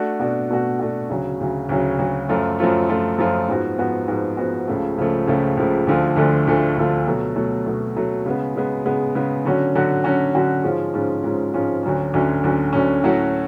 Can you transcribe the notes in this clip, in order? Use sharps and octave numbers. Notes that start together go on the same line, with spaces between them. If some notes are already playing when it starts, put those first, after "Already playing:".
Already playing: A3 D4 F#4
B2 A3 D4 F#4
B2 A3 D4 F#4
B2 A3 D4 F#4
D2 C#3 F#3
D2 C#3 F#3
D2 C#3 F#3
D2 C#3 F#3
F#2 F3 A3 F4
F#2 F3 A3 F4
F#2 F3 A3 F4
F#2 F3 A3 F4
G#2 F3 B3 F#4
G#2 F3 B3 F#4
G#2 F3 B3 F#4
G#2 F3 B3 F#4
C#2 C#3 F3 A3
C#2 C#3 F3 A3
C#2 C#3 F3 A3
C#2 C#3 F3 A3
D2 D3 F3 A3 F4
D2 D3 F3 A3 F4
D2 D3 F3 A3 F4
D2 D3 F3 A3 F4
B2 F#3 A3
B2 F#3 A3
B2 F#3 A3
B2 F#3 A3
C#3 G#3 B3
C#3 G#3 B3
C#3 G#3 B3
C#3 G#3 B3
D3 F#3 C#4 F#4
D3 F#3 C#4 F#4
D3 F#3 C#4 F#4
D3 F#3 C#4 F#4
G#2 F3 G#3 C#4 F4
G#2 F3 G#3 C#4 F4
G#2 F3 G#3 C#4 F4
G#2 F3 G#3 C#4 F4
D2 D3 F#3 C#4
D2 D3 F#3 C#4
D2 D3 F#3 C#4
D2 D3 F#3 C#4
A2 F#3 A3 C#4 F#4